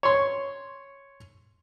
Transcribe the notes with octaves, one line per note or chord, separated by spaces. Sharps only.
C#5 C6